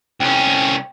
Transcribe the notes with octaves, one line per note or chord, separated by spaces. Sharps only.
C2 C#4 G5